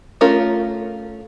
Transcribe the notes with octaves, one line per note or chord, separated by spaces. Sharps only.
A3 C#4 F4 A#4